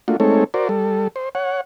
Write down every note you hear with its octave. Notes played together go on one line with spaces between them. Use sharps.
A3 A#3 D4 F4 F#4
G#3 A3 C4 D#4 A4 C#5
F#4 A#4 C5 D5
G3 A4
C5
C#5 F#5